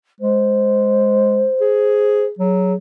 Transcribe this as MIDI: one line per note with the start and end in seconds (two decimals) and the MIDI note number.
0.20 1.47 56
0.20 2.25 72
1.60 2.31 68
2.39 2.74 54
2.39 2.75 68